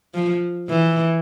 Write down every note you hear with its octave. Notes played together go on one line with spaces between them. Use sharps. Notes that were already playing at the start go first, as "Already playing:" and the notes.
F3
E3